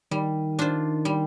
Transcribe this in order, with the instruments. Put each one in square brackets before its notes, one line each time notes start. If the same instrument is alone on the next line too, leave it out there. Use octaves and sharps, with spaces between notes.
[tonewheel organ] D#3 [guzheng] G3
[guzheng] D4 F4 C5
G3